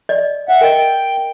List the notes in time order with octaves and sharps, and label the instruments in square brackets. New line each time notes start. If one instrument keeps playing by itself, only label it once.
[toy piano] D5 D#5
[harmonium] E5 F#5
[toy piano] A#4 D#5 [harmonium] G5